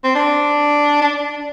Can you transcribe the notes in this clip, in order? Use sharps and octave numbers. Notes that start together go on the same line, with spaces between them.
C4
D4
D4